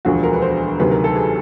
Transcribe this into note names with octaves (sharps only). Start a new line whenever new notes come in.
E1 D2 D3 F3 F#4
A#4
B4
C5
D2 C3 D#3 F#3 B4
A#4
A4
G#4